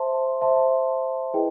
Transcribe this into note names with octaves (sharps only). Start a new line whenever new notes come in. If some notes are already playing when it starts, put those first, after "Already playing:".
Already playing: C5 E5 A5 C6
C5 E5 A5 C6
E4 G#4 B4 D#5 G5